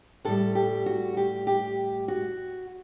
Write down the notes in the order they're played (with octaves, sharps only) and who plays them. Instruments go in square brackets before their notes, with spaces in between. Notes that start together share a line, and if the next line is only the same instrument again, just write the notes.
[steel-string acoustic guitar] A2 G3 A4
G4
F#4
G4
G4
F#4